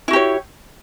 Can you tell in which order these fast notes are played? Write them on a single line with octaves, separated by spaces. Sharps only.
E4 F#4 G4 C#5